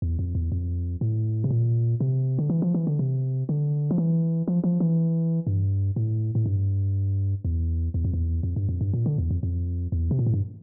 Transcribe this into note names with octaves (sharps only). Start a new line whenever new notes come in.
E2
F2
E2
F2
A2
C3
A#2
C3
D3
E3
F3
E3
D3
C3
D3
F3
E3
F3
F3
E3
G2
A2
A2
G2
E2
E2
F2
E2
F2
G2
F2
G2
A#2
D3
E2
F2
F2
E2
C3
A#2
A2
G2